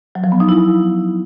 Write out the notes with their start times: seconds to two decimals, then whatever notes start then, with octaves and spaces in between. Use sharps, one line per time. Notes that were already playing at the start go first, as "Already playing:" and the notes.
0.15 F#3
0.24 F3
0.32 B3
0.40 D#4
0.49 E4